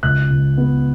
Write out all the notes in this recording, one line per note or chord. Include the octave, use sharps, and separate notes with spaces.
C#2 F#6
C#2
B3